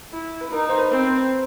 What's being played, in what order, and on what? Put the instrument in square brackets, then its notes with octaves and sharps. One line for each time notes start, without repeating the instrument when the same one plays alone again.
[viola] E4
[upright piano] B4
[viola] D#4 [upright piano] A#4
[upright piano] C5
B4
[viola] C4
[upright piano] B4